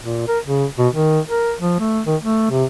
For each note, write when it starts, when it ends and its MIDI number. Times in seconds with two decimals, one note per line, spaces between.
0.02 0.23 46
0.28 0.39 70
0.44 0.66 49
0.78 0.88 47
0.93 1.20 51
1.29 1.53 70
1.59 1.76 53
1.79 2.01 57
2.06 2.16 51
2.22 2.50 57
2.50 2.65 48